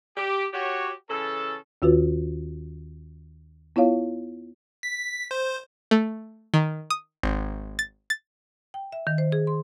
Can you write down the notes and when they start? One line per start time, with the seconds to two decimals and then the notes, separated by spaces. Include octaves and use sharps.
0.17 G4
0.53 F#4 G4 C#5
1.10 C#3 E3 C#4 A4
1.82 D#2 D#3 F4 F#4 B4
3.76 B3 E4 F4 C#5 F5
4.83 B6
5.31 C5
5.91 A3
6.54 D#3
6.90 D#6
7.23 G#1
7.79 A6
8.10 A6
8.74 G5
8.92 E5
9.07 D#3
9.18 C5
9.32 G#4
9.47 C6